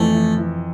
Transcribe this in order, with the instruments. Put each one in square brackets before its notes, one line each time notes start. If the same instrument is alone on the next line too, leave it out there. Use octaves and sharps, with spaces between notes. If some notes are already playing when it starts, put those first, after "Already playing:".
Already playing: [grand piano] F2 E3 [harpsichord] A3
[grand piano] E3
E3